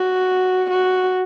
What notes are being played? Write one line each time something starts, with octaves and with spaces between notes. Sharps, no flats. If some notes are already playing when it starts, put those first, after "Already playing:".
Already playing: F#4
F#4